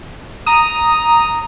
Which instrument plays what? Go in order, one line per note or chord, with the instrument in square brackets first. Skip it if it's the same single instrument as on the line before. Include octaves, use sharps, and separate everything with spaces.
[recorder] A#5 [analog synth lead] D#6